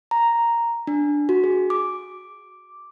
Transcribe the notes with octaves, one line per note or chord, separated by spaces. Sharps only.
A#5
D4
F#4
G#4
D6